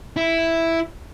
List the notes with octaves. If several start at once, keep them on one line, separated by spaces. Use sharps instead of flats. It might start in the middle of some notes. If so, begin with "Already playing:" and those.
E4